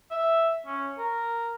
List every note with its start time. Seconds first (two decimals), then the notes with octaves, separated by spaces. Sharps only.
0.11 E5
0.66 C#4
0.98 A#4